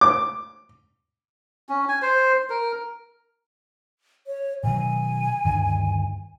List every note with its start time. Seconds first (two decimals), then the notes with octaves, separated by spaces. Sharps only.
0.01 D6
1.69 C#4
1.89 G#5
2.02 C5
2.50 A#4
4.27 C#5
4.64 B2 D#3 F#3 G#5
5.45 D2 G2 D#3